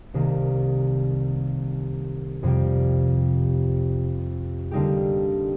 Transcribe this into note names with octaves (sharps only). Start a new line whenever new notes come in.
C2 C3 D#3 A#3
F2 C3 G3
D3 G3 A#3 D#4 G4